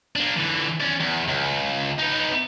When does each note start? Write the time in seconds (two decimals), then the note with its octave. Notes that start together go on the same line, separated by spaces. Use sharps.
0.16 A#3 D4
0.36 D3 E3
0.81 C#4 D5
1.00 E2
1.28 C#2
1.99 B3 D#4